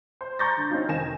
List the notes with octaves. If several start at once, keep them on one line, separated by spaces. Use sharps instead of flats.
C5
A#5 C6 C#6 G6 A6 A#6
D3
C4 C#4 D#4 F4
F1 D#3 G#5 A#6 E7